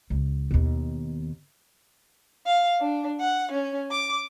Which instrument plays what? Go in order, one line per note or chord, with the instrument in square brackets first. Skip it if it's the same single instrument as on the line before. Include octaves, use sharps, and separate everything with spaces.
[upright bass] C#2
D#2 B2
[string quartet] F5
D4
F#5
C#4
D6